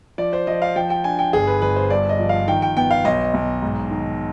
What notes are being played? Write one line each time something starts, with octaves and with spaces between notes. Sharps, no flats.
F3 D5
C5
F3 D#5
F5
F3 G5
G5
D4 G#5
G5
G1 G#4
B4
G1 B4
C5
G2 D5
D#5
F3
F5
D#3 G5
G5
B3 G5
F5
B1 D#5
B1
G#2
D#3